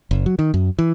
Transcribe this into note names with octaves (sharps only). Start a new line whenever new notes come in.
F#1
F#3
D#3
F#2
E3